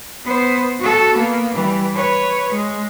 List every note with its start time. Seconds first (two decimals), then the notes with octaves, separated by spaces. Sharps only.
0.25 B3 C5
0.79 F#4 A4
1.14 A#3 B3
1.53 E3 G3
1.94 B4 C#5
2.52 G#3